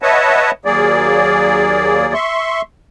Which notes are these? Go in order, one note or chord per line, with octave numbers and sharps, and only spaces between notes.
B4 C#5 D#5 E5 F#5 A5
D#2 F#3 A#3 G#4 D5
E5 C6 C#6